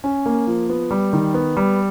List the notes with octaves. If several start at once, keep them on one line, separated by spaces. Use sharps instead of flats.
C#4
A#3
F3
B3
G3
D#3
B3
G3